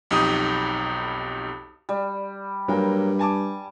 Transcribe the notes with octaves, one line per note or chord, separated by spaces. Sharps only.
B1 F2 D#4 G4 D#6
G3
G2 F#3 A#3 G5
G#5 A5 D6